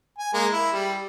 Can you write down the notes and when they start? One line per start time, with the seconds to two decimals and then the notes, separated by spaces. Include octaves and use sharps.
0.18 G#5
0.34 G#3 A#3
0.52 E4
0.72 G3